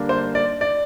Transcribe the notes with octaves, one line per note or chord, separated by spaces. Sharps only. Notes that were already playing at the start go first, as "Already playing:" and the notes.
Already playing: D3 G3 A#3 D4
C5
D5
D5